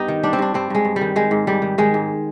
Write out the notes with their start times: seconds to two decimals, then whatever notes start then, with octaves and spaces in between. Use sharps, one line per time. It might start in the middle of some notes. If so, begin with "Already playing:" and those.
Already playing: G2 B3 D#4 G4
0.08 D#3
0.23 G3 D4
0.33 C4
0.39 G2 D4
0.54 G2 C4
0.70 G2 G#3
0.85 G2
0.96 G3
1.01 D#3
1.16 D#3 G#3
1.31 G#2
1.47 G#2 G3
1.62 D#3
1.78 D#3 G#3
1.94 G#2